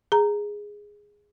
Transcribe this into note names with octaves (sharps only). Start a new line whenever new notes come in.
G#4 A#5